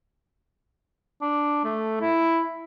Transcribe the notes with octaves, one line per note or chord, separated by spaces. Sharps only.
D4
A3
E4